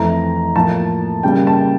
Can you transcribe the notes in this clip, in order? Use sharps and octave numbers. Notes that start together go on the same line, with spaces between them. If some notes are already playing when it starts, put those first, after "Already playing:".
Already playing: F2 E3 A3 A#5
A2 F3 A#3 A5
C#3 G3 A#3 G5
A5